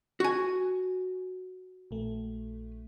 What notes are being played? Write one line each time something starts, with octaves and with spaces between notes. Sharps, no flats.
F#4 G#5
A#1 A3